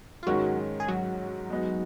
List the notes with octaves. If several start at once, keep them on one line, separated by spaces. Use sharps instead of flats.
F4
G#2 D#3 F#3 G#3 C#4 F#4
G#4
F#3 F#4
G#3 B3 D#4